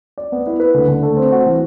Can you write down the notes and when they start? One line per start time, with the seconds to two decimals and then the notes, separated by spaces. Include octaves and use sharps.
0.18 D5
0.32 B3
0.47 E4
0.60 B4
0.74 D3
0.88 D3
1.03 A3
1.17 C4
1.32 F#4
1.46 E3